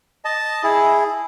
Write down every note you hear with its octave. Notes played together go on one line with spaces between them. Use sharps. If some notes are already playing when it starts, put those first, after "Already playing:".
D#5 A5
E4 G#4